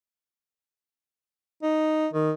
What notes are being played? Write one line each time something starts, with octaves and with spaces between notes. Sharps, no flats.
D#4
D#3